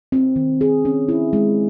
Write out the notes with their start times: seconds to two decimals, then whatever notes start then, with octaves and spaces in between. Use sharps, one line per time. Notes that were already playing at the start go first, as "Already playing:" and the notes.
0.12 C4
0.36 D#3
0.61 G#4
0.85 C#4
1.09 E4
1.33 G#3